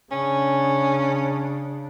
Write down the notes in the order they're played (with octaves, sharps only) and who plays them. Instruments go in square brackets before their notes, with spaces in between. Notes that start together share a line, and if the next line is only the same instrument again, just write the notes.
[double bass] C#3 D4 [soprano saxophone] C#4